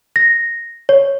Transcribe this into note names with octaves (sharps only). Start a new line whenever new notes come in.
A#6
C#5